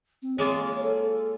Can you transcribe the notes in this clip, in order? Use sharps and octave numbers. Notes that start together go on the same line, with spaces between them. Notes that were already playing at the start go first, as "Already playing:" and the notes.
C4
G#3 A#3 F4 C#5
A4